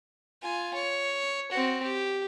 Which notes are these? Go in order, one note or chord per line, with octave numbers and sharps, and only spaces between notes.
F4 G#5
C#5
C4 F#4
G4